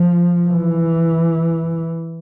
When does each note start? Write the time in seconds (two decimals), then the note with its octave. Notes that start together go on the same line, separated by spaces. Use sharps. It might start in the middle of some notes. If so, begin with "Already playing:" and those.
Already playing: F3
0.49 E3